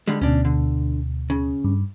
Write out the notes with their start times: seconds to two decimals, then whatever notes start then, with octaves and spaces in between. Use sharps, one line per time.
0.08 D3 G3 G#3
0.22 D2 B2 C#4 D4
0.45 D3
1.30 C#3
1.64 G2